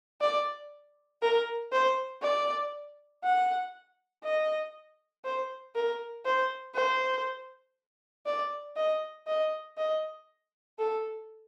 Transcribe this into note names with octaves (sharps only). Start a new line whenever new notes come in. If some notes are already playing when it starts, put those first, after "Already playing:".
D5
A#4
C5
D5
F#5
D#5
C5
A#4
C5
C5
D5
D#5
D#5
D#5
A4